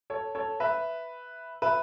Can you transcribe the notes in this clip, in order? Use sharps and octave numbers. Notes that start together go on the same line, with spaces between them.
A4 C#5
A4 C#5
B4 E5
B4 E5